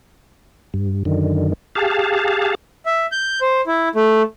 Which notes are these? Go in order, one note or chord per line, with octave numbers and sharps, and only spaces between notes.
G2
F#2 D3 D#3
G4 G#4 F5 A5
E5
G6
C5
E4
A3